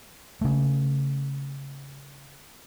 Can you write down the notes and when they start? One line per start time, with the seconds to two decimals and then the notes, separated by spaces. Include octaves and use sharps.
0.41 C#3 A3